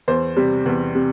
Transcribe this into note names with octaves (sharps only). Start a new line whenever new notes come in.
E2 C5
C3 G3
E2
C3